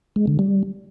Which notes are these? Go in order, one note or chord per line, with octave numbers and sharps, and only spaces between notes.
G#3
D3
G3